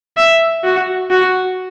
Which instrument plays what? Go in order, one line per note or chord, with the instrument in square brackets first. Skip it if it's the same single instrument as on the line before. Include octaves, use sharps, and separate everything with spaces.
[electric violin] E5
F#4
F#4